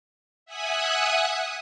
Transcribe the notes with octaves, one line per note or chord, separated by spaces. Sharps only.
E5 F#5 G#5 D#6 F#6